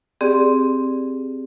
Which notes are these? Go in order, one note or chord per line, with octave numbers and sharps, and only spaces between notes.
C4 G4 G#4 D5